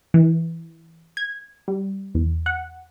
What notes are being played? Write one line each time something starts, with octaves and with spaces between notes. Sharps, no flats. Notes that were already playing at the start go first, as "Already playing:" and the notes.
E3
G#6
G3
E2
F#5